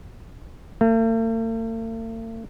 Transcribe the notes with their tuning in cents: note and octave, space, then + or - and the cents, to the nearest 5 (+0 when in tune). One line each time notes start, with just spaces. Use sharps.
A3 +45